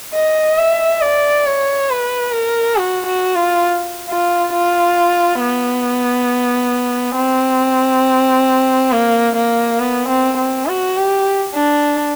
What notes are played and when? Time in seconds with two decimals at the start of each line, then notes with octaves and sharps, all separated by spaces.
0.14 D#5
0.58 E5
1.01 D5
1.46 C#5
1.90 B4
2.33 A#4
2.76 F#4
3.06 F#4
3.35 F4
4.09 F4
4.53 F4
5.40 B3
7.16 C4
8.92 A#3
9.36 A#3
9.79 B3
10.08 C4
10.37 C4
10.67 F#4
10.97 G4
11.54 D4